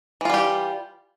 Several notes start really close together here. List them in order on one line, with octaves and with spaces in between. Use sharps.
E3 F4 G3 G4